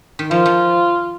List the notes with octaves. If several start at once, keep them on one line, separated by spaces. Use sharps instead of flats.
D#3
F3 F4
F3